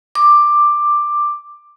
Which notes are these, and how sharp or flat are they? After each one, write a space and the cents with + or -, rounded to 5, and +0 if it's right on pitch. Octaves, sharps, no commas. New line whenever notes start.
D6 +10